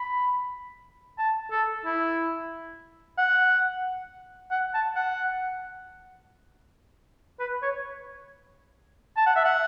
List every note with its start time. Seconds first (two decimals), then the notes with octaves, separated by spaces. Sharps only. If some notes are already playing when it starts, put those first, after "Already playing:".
Already playing: B5
1.18 A5
1.51 A4
1.85 E4
3.18 F#5
4.51 F#5
4.74 A5
4.96 F#5
7.40 B4
7.62 C#5
9.17 A5
9.27 F#5
9.36 E5
9.45 F#5